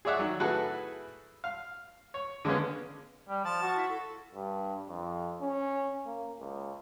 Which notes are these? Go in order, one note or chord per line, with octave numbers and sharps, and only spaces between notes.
G#4 C#5 D5 E5 F#5
D#3 F#3
A2 E4 F#4 G#4 A4 B4
F5
C#5
D3 G#3 A#3 B3 C#4
G3
F3 A5
F#4
E4
A4
G2
F2
C#4
A#3
C#2